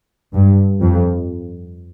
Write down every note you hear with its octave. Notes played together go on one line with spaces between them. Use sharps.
G2
F2